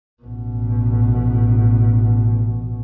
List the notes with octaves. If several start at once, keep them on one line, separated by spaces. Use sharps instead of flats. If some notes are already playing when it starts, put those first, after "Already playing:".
A1 B2